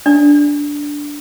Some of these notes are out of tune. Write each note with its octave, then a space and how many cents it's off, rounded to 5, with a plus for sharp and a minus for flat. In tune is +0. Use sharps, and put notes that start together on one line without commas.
D4 -10 D5 +0